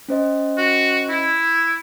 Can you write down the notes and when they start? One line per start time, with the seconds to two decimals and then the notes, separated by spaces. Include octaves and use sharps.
0.08 C#4 C5 D#5
0.57 F#4
1.09 E4